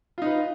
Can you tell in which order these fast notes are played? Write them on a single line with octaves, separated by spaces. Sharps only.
F4 D#4 B4